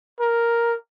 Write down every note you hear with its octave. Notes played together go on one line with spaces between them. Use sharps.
A#4